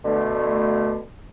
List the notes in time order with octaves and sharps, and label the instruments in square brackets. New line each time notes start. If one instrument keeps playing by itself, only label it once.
[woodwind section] B2 D3 A3